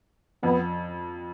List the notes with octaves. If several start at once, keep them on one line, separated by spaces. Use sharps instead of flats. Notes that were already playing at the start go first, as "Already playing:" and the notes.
F2 B3